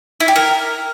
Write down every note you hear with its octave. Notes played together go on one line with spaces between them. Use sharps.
E4
G4
A#4